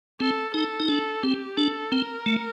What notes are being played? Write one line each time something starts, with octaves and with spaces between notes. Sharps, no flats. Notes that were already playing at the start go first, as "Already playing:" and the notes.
C4 A4
D#4 A4
D#4
D4 A4
C4 G4
D4 A4
C4 A#4
A3